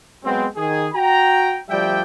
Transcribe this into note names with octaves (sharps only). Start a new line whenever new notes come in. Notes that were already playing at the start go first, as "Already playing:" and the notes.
F#3 G#3 B3 C4
D#3 G#4
F#4 G5 A#5
D2 F3 G3 D5 E5 G5